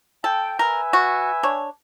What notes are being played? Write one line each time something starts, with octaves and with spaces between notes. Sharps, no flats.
A4 G5
A#4 B4 E5 G#5
F#4
D4 C#5